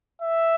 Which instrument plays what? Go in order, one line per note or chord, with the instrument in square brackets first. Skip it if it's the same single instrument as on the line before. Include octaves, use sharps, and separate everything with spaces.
[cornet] E5